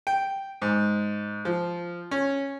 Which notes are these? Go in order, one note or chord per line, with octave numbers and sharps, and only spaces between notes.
G5
G#2
F3
C#4